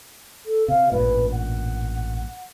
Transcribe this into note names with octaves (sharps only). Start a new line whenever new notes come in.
A4
C3 F5
A1 G2 A#2 B4
F#5